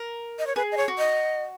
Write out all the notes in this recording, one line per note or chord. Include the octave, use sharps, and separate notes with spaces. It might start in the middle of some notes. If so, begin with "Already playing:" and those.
Already playing: A#4
D#5
C#5
G#4 B4
D#5
C#5
F#4
D#5